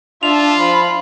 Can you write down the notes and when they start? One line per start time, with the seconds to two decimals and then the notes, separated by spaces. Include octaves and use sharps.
0.23 D4 F4 E5 A5 F7
0.59 F3 F5 B5